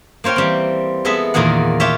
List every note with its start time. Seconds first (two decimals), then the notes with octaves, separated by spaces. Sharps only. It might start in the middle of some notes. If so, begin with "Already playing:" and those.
0.24 A#3 C5 C#5 F5 G5
0.36 E3 G3 C4
1.05 G#3 B3 G#4 A4 E5
1.34 E2 A#2 D#3 A#3 G#4 F#5
1.80 F4 G4 C#5 E5